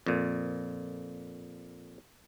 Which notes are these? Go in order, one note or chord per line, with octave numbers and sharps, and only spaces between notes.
F2 A#2